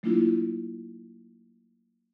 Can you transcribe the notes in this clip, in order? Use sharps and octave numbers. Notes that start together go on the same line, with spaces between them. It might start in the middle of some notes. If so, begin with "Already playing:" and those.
F#3 A3 A#3 D4 E4 F4